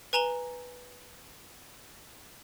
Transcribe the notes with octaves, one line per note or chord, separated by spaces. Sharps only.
B4 G#5 A#5 E7 G7